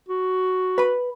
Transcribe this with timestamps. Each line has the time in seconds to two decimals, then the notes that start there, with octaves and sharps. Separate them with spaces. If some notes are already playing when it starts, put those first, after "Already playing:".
0.08 F#4
0.78 B4 B5